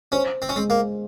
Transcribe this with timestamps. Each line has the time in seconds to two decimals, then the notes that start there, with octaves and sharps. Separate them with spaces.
0.12 C#4 C5
0.42 C4
0.49 C#4
0.56 G#3 C4
0.70 A#3